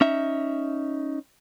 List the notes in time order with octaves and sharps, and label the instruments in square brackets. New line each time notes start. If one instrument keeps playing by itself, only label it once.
[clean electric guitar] C#4 D#4 E5